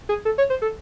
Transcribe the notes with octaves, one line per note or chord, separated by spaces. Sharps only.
G#4
A4
C#5
C5
A4